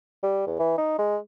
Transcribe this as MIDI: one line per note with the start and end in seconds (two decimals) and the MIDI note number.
0.23 0.43 55
0.47 0.58 40
0.59 0.75 52
0.78 0.96 63
0.98 1.17 56